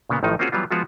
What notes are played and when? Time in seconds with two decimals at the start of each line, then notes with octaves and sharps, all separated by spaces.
0.09 A#2 C#3 A#3 B3
0.23 A1 A2 D#3 F3 D#4
0.39 A#3 C4 C#4 F4 F#4 G#4
0.52 E3 F#3 G3 B3 F4
0.71 F3 G#3 B3 F4 F#4